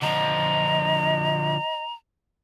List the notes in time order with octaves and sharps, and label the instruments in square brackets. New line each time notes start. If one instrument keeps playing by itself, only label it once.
[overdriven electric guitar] D3 F3 [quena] D#5 [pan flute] A#5